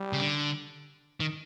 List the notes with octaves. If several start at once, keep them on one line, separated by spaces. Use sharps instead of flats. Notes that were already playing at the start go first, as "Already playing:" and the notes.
Already playing: G3
C#3
D3
D#3